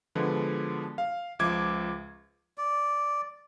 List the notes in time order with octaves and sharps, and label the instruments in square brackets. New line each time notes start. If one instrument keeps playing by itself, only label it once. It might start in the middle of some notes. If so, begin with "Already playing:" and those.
[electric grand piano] B2 D3 F3 G#3 B3
F5
C#2 F3 E5 D6 G#6
[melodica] D5